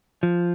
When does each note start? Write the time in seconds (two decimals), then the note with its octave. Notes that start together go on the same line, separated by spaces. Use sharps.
0.23 F3